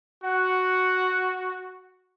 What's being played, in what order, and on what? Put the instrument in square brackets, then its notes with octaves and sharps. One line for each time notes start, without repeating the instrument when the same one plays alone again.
[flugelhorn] F#4 [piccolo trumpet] F#5